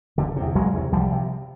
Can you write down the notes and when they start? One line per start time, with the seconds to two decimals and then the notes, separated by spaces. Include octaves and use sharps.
0.18 F#1 D3
0.36 E2 C3
0.55 F#1 F#3 G#3
0.74 E2 C3
0.92 C2 F3 G3
1.12 C3